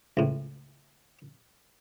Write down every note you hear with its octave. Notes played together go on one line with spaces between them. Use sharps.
C#2 A2